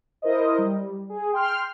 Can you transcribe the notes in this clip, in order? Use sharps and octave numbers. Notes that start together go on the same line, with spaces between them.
E4 A#4 C5 D#5
G3
G#4
G5 C6 F6